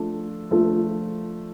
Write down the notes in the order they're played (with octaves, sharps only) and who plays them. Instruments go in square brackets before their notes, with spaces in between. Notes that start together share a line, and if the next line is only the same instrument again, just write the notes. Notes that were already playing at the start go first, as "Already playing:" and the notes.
Already playing: [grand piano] F3 A3 D4 A4
F3 A3 D4 A4